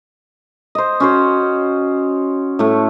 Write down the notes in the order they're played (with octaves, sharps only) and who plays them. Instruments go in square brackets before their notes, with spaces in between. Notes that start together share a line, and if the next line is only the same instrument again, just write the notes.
[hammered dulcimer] C5 D#5
C#4 F#4 C5
A2 A3